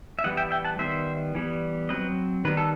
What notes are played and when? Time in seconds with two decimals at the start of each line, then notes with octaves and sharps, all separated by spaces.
0.19 E5
0.24 E3 G3 B3 D#5 F#5
0.37 E5 G5
0.51 E5 G5
0.65 F#5 A5
0.78 D#3 G3 B3 C5 E5
1.35 E3 G3 B3
1.89 F#3 C4 B4 D#5
2.45 D#3 G3 B3 B4
2.57 A4